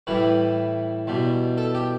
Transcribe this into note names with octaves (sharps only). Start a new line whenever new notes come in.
A2 E3 G3 B4
E2 B2 G3
A4
G4